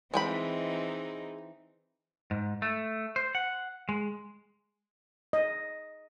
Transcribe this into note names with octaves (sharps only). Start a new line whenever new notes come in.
E3 G#3 C4 D#4 G5 B5
G#2
A3
C5
F#5
G#3
D#5